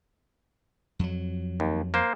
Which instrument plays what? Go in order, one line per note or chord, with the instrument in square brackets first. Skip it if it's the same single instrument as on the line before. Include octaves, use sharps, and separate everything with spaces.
[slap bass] F2 F#3
[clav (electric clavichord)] D#2
A#3 C5